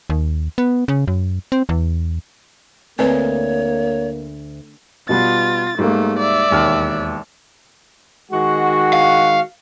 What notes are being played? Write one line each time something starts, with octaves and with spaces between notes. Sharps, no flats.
D#2
B3
C#3
F#2
C4
E2
D2 A#3 C4 B4 C#5
B2 G3 B3 F4 A6
G#2 G3 A3 A#3
D5 E5
E1 D#2 F6
D#3 G#3 F#4
F5